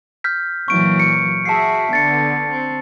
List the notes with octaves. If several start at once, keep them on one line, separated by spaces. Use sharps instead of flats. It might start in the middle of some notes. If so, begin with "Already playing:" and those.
F6 G6 B6
A#2 E3 F#3 C#6 D7
C#7
F#4 G#4 E5 A5 C7
D3 B3 A6 C#7
C4